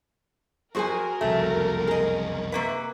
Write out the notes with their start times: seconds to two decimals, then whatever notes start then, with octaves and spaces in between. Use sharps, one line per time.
0.75 F2 F#4 G#4 A#4 C5 G#5
1.21 F#1 C2 F2 A3
1.87 G#4 D#5
2.52 C3 A#3 B4